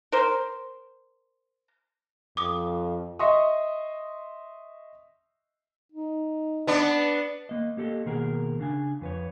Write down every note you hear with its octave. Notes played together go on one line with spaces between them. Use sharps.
A#4 C5
F2 D6 D#6
D#5 E5 C6 C#6 D#6
D#4
B3 D4
A#3 D#5
A#3 G4 A4 D5 D#5
B2 D#3 A#3 G#4 A#4
C#3 D4 G#5
F2 B4 C#5